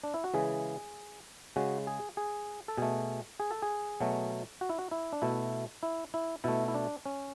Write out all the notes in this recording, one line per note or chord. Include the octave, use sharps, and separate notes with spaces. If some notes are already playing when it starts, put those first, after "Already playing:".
D4
E4
F#4
C#3 E3 G#3 G#4
C#3 G#3 F#4
G#4
G#4
A4
B2 A3 G#4
G#4
A4
G#4
B2 F#3 A3
F#4
E4
F#4
E4
D4
B2 A3 E4
E4
E4
B2 A3 E4
E4
D4
C#4